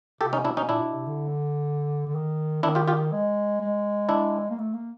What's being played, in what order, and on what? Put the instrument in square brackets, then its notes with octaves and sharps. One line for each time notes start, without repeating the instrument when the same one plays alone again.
[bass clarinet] C3 [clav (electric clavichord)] G4 A4
[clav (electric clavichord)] C#4 D#4
[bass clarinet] B2 [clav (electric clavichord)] D4 E4
[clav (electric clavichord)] C#4 D#4
[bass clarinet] A#2 [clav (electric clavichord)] D4 E4
[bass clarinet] B2
C3
D3
D3
D#3
[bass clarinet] D#3 [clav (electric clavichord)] D4 E4
[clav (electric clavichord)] F4 G4
F4 G4
[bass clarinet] G#3
G#3
[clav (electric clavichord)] D4 E4
[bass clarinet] A#3
A3
A#3